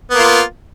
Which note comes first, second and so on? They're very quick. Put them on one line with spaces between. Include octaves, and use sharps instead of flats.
B3 A#3 F4